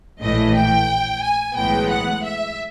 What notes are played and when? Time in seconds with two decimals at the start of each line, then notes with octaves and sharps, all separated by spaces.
0.21 A#1 A2 E3 A3 D#5
0.55 G5
1.22 G#5
1.56 B1 A2 E3 G#3 B3 G5
1.89 F#5
2.23 E5